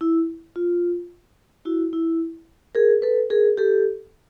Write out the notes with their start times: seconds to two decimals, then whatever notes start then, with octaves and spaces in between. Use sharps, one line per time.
0.01 E4
0.56 F4
1.65 E4 F#4
1.93 E4
2.75 G#4 A#4
3.02 A4 B4
3.30 G#4 A#4
3.57 G4 A4